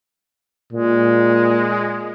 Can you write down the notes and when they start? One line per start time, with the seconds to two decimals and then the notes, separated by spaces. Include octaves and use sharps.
0.73 A#2 G#3